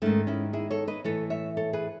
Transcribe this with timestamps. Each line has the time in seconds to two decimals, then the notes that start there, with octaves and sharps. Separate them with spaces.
0.02 G#2 D#3 A3 C#4
0.27 C#4 E4
0.53 E4 G#4
0.70 A4 C#5
0.88 B4 D#5
1.04 A2 E3 A4 C#5
1.30 C#5 E5
1.57 A4 C#5
1.73 G#4 B4